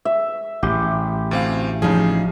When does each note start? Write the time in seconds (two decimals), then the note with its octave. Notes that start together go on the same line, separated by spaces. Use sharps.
0.05 E5
0.63 A1 G4
1.31 D2 C4 F5
1.82 C#3 F3 D#4 G#4